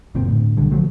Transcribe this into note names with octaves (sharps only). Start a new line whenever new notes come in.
F#1 E2 A#2 C4
D2 A2
B1 D3 G3
D3 F3 F#3 A3